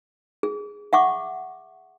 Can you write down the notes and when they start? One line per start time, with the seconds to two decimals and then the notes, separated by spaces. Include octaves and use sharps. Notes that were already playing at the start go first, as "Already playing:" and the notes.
0.43 G#4
0.93 E5 F#5 C#6 D6